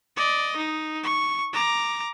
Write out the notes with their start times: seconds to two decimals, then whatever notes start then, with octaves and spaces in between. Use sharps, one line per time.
0.17 D5 D#5
0.57 D#4
1.03 C#6
1.53 A#5 D6